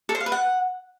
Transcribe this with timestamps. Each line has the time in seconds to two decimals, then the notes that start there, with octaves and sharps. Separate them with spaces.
0.09 A4
0.15 C5
0.20 F5
0.26 B4
0.32 F#5